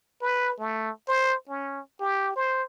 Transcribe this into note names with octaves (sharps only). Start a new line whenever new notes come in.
B4
A3
C5
C#4
G4
C5